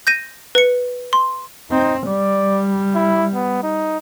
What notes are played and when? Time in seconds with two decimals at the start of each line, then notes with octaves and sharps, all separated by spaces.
0.07 G6 A#6 D#7
0.55 B4 C#7
1.13 C6
1.71 C4 D#4
2.07 G3 D5
2.95 E4
3.34 B3
3.63 D#4